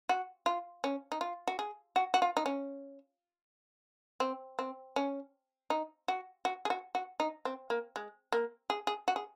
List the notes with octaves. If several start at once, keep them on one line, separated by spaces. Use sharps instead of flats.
F#4
F4
C#4
D#4
F4
F#4
G#4
F#4
F#4
F4
D#4
C#4
C4
C4
C#4
D#4
F#4
F#4
G#4
F#4
F#4
D#4
C4
A#3
G#3
A#3
G#4
G#4
F#4
G#4